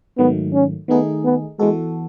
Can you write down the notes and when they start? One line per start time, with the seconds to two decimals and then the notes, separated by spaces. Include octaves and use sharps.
0.18 G#2 D#3 F#3 A3 B3
0.53 C#4
0.88 D#3 A3 B3 D#4 G#4
1.24 B3
1.59 E3 G#3 B3 F#4 A4